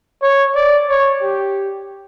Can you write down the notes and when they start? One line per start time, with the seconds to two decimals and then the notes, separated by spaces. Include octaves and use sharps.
0.22 C#5
0.55 D5
0.89 C#5
1.22 G4